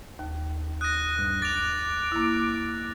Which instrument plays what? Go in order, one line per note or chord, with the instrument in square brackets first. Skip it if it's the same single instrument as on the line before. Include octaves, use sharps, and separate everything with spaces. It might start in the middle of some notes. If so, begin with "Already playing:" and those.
[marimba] D#2
[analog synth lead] D#6 [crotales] F#6 A#6
[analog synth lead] G2
[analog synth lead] D6 [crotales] A6 F7
[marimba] A#3 E4